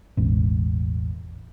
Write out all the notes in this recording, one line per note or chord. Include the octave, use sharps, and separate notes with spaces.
E1 A1